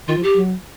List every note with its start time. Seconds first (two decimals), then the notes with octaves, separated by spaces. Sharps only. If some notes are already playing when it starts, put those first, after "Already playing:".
0.08 D#3 F4
0.17 F3
0.22 G4
0.37 F#3